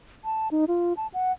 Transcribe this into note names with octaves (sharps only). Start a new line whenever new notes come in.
A5
D#4
F4
A5
F#5